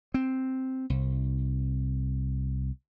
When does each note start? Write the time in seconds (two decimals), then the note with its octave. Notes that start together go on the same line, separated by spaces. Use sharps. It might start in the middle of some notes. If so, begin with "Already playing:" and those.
0.14 C4
0.90 C2